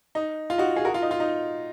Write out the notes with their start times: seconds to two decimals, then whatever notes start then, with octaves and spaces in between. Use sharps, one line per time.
0.15 D#4
0.50 F4
0.58 D#4 F#4
0.76 F4 G#4
0.85 F#4 A#4
0.94 F4
1.02 D#4
1.11 F4
1.20 D#4